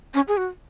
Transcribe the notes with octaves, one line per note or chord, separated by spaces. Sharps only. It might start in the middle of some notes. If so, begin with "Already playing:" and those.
C#4
G#4
F#4